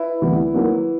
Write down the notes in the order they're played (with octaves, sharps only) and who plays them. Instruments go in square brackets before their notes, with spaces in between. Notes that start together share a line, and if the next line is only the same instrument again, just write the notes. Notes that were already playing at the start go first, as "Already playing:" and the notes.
Already playing: [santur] E4 B4
[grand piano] D2 C3 E3 G3 B3
D#3 F#3 A#3